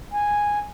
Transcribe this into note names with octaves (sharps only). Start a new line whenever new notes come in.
G#5